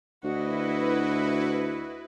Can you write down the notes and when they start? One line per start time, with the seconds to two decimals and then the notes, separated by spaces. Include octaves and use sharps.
0.24 D2 E4 F#4 B4 D#5